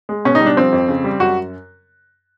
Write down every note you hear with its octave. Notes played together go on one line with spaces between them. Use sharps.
G#3
B2 C#4
D#4
G3
D4
F3 C4
F2
C#3
G3
F#2 F#4